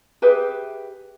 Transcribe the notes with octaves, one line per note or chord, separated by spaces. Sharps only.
G4 G#4 B4 E5